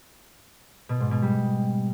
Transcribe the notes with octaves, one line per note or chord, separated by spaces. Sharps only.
B2
G#2
B2
G3